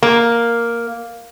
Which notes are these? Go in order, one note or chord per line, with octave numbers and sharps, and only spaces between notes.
A#3